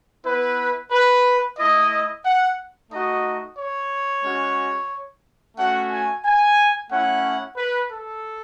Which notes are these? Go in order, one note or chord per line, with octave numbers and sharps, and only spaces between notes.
B3 E4 B4
B4
A3 E4 D#5
F#5
A3 D#4 F#4 D#5
C#5
G#3 C#4 F#4
A3 C#4 F#4 F#5
G#5
G#5
A3 C#4 E4 F#5
B4
A4